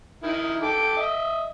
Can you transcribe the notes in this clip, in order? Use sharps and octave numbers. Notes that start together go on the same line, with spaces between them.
D#3 D#4 E4
A4 G5 D6
D#5 E5